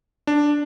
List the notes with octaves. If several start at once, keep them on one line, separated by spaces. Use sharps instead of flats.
D4